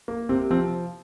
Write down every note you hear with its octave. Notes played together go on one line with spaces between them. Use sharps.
A#3
C3 C4
F3 C4